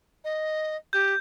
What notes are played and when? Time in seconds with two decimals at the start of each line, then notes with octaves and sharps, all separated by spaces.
0.24 D#5
0.93 G4 G6